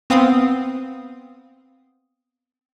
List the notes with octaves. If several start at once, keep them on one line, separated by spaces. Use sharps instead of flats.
B3 C4 F5 D#6